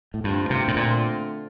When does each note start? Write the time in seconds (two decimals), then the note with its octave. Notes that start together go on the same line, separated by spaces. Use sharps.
0.14 A2
0.24 G2 D3 A3 C4 F4
0.50 C3
0.68 A2
0.76 A#2